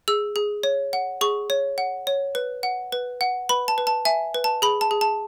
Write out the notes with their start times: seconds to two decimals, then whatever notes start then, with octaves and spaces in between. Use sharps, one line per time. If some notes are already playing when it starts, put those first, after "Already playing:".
0.08 G#4 E6
0.36 G#4
0.63 C#5
0.93 F#5
1.21 G#4 C#6
1.50 C#5
1.78 F#5
2.07 C#5
2.35 B4
2.63 F#5
2.92 B4
3.21 F#5
3.49 B4 B5
3.68 A5
3.78 B4
3.87 A5
4.05 E5 G#5
4.34 B4
4.44 A5
4.62 G#4 B5
4.81 A5
4.91 G#4
5.01 A5